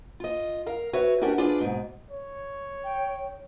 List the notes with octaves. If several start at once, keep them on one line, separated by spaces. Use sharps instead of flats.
F4 D#5
A#4 F5
F#4 B4 C#5 E5
C#4 D4 F#4 G4 A#4 D5
D4 F4 G#4 B4 D5
G#2 B2
C#5
G5